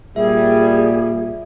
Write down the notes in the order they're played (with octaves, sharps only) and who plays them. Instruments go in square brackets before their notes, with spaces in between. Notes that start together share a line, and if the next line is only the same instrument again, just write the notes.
[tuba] A#2 [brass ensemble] G3 [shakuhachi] G#4 [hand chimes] E5